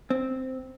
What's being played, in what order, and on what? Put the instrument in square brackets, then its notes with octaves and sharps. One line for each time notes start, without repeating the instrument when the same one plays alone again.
[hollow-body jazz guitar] C4